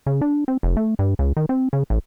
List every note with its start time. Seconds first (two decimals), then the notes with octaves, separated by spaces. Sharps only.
0.06 C#3
0.21 D4
0.48 C4
0.63 F1
0.77 A3
0.99 G2
1.19 C#2
1.37 D#3
1.49 C4
1.73 C#3
1.90 A1